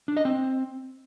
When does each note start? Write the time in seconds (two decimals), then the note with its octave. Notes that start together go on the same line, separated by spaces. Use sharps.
0.08 D4
0.17 D#5
0.25 C4